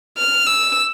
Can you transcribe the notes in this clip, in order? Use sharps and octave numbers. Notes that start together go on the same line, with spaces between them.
F6
E6